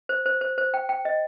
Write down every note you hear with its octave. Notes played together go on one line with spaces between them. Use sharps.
C5
C5
C5
C5
G5
G5
D#5